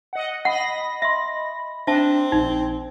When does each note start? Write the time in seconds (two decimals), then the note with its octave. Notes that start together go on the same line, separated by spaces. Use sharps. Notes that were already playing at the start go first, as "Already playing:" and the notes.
0.13 D#5 F#5
0.45 D#5 F#5 B5 A#6
1.02 E5 C6
1.87 C4 D4 E5 A5
2.32 A#1 D#4